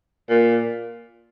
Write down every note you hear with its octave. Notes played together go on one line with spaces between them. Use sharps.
A#2